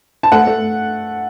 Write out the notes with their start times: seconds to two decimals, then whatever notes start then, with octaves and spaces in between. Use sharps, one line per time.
0.23 A5
0.32 A3 F#5
0.47 A3